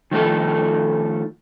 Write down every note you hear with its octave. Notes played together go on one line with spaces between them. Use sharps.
D#3 F3 A3 A4